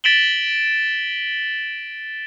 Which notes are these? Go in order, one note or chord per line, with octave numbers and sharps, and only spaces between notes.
A6 B6 D7 E7 F#7 G7